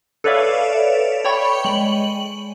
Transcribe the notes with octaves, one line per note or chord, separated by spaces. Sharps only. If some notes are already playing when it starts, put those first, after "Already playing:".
A4 B4 C#5 D5 E5 F5
C#5 D5 G5 B5 C#6
G#3 F#7